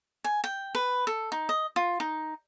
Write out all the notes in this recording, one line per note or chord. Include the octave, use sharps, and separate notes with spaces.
G#5
G5
B4
A4
D#4
D#5
F4
D#4